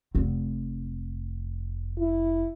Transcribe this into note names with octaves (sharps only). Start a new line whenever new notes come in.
F1 C4
E4